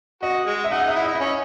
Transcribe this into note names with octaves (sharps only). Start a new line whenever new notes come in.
F#4 D#5
G#3
E5
D#4 F#5
D#4
E5
E4
D#5
E4
D#5
C#4 C#5